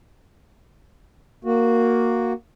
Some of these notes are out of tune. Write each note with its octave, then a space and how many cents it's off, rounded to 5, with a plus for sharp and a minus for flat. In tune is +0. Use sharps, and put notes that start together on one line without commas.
A#3 +0 F#4 -5